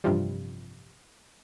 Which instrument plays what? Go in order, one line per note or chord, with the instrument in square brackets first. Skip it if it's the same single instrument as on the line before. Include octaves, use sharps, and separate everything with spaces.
[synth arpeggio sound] A1 G2 C3 F3 G3